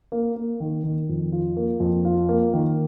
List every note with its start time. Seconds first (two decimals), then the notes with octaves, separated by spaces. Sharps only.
0.12 A#3
0.36 A#3
0.60 D#3
0.84 D#3
1.09 F2
1.32 F4
1.57 A#3
1.80 F2
2.05 F4
2.29 A#3
2.53 D#3